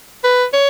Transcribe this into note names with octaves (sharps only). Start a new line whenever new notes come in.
B4
C#5